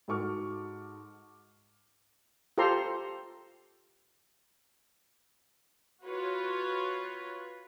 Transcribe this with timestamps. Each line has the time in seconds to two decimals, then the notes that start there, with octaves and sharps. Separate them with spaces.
0.08 G#2 F#4 A4 C#6 D6 F6
2.58 F4 G4 A4 C5 A#5 C6
6.04 F4 F#4 B4 C#5